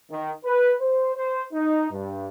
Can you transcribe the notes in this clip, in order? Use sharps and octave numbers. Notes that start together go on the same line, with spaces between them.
D#3
B4
C5
C5
D#4
G2